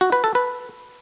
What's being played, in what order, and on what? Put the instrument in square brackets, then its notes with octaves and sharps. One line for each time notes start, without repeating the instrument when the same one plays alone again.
[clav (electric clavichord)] F#4
B4
A4
B4